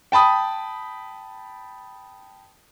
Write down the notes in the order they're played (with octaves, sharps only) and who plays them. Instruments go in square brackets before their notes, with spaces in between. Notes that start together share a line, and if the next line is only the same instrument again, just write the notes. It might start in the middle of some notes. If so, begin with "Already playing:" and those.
[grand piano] G5 A5 B5 D#6